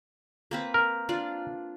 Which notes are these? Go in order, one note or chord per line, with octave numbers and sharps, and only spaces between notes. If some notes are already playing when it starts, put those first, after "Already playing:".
A#3 C4 B4
A#4
D4 F4 D5